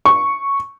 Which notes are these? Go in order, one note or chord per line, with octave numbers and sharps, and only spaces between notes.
C#6